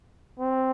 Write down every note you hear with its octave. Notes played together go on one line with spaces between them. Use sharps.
C4